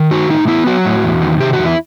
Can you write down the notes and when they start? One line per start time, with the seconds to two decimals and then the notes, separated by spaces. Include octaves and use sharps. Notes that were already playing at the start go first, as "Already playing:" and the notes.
Already playing: D#3
0.11 D#4 F#4
0.30 A2 D#4
0.48 B3 E4
0.66 F#3 F#4
0.85 A2
1.04 E2
1.22 D#3
1.40 C3 G4
1.53 F#4
1.59 E2
1.65 E4